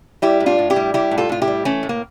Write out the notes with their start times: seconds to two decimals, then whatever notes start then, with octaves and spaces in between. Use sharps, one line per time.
0.22 G3 E4 G4
0.40 A2
0.46 D4 F4
0.59 A2
0.70 E4 G4
0.76 G3
0.94 G3 E4 G4
1.11 A2
1.18 F4 A4
1.29 A2 F4
1.42 E4 G4
1.48 G3
1.65 E3 A3 C#4
1.83 A2
1.89 A#3